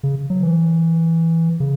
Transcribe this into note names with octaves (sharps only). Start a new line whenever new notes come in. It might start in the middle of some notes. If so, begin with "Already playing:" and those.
C#3
F#3
E3
C#3